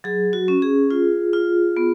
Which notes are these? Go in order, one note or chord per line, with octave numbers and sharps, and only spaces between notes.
F#3 G#4
F#4
C#4
G#4
F4
F4
B3